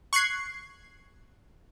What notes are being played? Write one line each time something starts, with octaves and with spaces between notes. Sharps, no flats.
C#6 F#6 G#6 C7